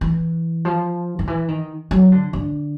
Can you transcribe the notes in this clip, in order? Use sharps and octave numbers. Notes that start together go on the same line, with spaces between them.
E3
F3
D#3
E3
D#3
F#3
D3
D3